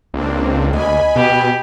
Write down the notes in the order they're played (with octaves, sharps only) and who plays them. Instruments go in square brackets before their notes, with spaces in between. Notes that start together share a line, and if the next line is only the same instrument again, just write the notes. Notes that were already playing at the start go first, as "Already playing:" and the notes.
[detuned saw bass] C#2 [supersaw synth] A#3 C4 D4
[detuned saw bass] D2 [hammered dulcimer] D#5 [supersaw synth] G#5 B5
[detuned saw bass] B2 [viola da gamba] G4